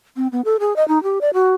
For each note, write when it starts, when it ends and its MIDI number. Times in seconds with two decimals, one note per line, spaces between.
0.16 0.27 60
0.32 0.41 59
0.45 0.57 69
0.60 0.76 68
0.76 0.87 75
0.88 1.01 63
1.03 1.19 67
1.21 1.30 74
1.34 1.55 66